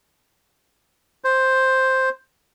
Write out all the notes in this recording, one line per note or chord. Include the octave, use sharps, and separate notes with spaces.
C5